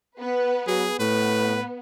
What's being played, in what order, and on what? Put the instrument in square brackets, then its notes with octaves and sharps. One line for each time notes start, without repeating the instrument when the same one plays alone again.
[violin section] B3 B4
[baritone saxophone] F#3 [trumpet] G#4
[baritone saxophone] A2 [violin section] B3 [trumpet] B4